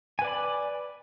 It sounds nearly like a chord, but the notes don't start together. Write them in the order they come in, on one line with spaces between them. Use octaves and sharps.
G#5 B4 D5 B5